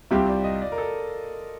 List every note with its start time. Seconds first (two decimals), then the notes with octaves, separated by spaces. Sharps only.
0.11 C2 C3 G3 C4 F4 G4
0.28 D5
0.44 D#5
0.62 D5
0.72 A#4
0.78 A4